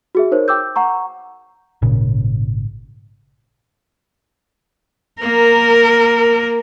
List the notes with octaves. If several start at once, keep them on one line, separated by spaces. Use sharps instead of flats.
F#4 G#4 E5
D#4 A#4 C5 C#5
G5 D6 E6 G6
F#5 A#5 C#6
G#1 A#2 C#3
A#3 A#4